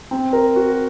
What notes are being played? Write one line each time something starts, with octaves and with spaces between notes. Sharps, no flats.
C4
A#4
F#4